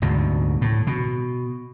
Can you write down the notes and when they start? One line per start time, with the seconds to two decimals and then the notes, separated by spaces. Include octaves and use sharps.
0.02 D2 G#2 B2
0.61 A2
0.87 B2